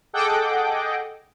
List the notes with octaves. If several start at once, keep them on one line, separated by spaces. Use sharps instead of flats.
G#4 A4 D#5 F#5 G5 D6